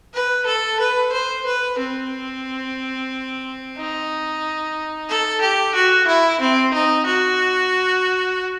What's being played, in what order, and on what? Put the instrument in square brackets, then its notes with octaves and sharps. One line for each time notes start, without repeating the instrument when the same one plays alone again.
[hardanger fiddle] B4
A4
B4
C5
B4
C4
D#4
A4
G4
F#4
E4
C4
D#4
F#4